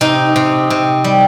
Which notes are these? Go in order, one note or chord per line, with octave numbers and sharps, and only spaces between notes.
C3 D#4
C3
C3
G3